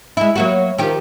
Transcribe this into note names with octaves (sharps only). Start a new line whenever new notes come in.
G#3 E4
F#3 A#3 F#4
D#3 F3 G4